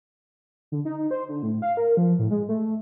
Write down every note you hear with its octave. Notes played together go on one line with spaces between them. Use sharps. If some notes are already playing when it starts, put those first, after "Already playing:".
D3
D#4
D#4
C5
D3
A2
F5
A#4
F3
A2
G#3
A3